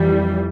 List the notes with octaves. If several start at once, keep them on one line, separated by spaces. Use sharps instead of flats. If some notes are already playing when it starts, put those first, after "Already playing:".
Already playing: F2 E3 G3